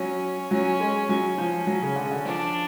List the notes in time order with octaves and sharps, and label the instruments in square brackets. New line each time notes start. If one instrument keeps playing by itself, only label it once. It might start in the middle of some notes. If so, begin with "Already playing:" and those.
Already playing: [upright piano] F#3 [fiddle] C#4
[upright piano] F#3 [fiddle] C#4
[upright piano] G#3
[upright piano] F#3 [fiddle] C#4
[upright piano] F3
F#3
C#3
D3
C#3
D3
[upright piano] F3 [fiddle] D4